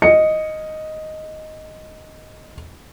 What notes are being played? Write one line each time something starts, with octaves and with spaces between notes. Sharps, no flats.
D#5 C#7